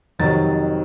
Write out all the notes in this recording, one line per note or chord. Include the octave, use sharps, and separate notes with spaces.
F2 C3 D#3 F#3 A6